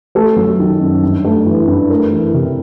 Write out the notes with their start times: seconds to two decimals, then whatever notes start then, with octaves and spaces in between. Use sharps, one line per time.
0.15 A3 A4
0.37 F#3
0.60 D#3
0.81 F#2
1.03 G2
1.25 A3
1.47 E3
1.68 G2
1.90 A3 A#4
2.12 E3
2.34 C3